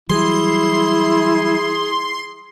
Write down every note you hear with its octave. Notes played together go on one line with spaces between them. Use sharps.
E3 F#3 G3 E4 G#4 C6